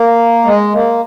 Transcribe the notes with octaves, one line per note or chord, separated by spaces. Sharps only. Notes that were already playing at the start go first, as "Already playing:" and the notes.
Already playing: A#3
G#3
A#3